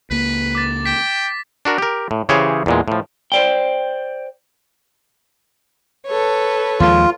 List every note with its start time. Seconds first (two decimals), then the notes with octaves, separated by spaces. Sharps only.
0.11 C#2 A#3 B4
0.55 D6 A6
0.86 G5 B6
1.65 D4 F#4 A#4
1.78 G4 A#4
2.11 A2
2.29 C#3 E3 G4 G#4 C5 C#5
2.66 E2 A#2 G#3
2.88 A2 F3
3.32 C5 D5 G5
6.06 A4 B4 C#5
6.80 D#2 F3 G#3 F4